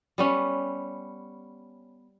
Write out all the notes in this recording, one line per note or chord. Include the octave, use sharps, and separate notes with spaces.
G3 B3 C#4